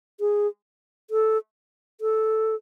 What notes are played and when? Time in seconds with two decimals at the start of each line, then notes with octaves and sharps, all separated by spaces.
0.20 G#4
1.10 A4
2.01 A4